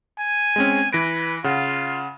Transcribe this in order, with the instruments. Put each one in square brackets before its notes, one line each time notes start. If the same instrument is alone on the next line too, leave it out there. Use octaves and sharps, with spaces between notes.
[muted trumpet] G#5
[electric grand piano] G#3 C4 C#4
[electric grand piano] E3 A#6 D7 [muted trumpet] B4
[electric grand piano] C#3 F#5 [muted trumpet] F4